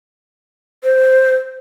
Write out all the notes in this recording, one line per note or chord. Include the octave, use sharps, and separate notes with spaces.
C5